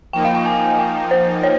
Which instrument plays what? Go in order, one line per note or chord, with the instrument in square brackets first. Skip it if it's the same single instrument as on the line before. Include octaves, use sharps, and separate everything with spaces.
[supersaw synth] F3 A#3 D#4 [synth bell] G5
[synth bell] F5
G5
G#5
G5
C5
C#5